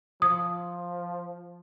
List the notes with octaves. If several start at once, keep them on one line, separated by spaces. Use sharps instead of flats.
F3 D#6